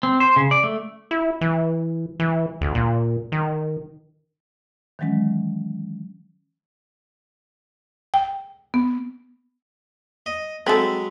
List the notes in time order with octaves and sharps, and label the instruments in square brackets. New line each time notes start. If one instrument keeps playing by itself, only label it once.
[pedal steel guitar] C4
C5
C#3
D5
A3
[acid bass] E4
E3
E3
D2
A#2
D#3
[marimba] D#3 E3 F#3 G#3 C#4
G5
B3
[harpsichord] D#5
[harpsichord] F#3 G#3 B5 [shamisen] C4 A4